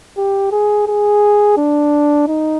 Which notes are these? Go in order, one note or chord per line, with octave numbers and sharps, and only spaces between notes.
G4
G#4
G#4
D4
D#4